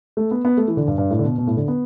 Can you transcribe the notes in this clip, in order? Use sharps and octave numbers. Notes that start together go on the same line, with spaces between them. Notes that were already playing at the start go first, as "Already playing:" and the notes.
A3
B3
B3
A3
E3
D3
G2
G2
A2
D3
B2
B2
A2
D3
B3